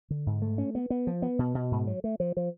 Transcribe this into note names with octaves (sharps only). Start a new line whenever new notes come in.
D3
G#2
A3
C#4
B3
B3
F3
B3
B2
B2
G#2
F#3
A3
F3
F3